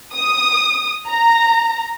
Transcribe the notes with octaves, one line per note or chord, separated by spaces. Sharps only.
D#6
A#5